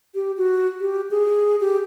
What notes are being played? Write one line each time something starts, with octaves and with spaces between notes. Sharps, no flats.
G4
F#4
G4
G#4
G4